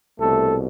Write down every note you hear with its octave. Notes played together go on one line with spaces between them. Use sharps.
C2 B2 A3 A4